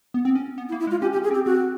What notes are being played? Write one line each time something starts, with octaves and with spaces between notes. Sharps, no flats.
B3
C4
C#4
B3
E4
A#3
E4
G#3
F4
C#4 G4
G4
C#4
G#4
C4
G4
C4 F#4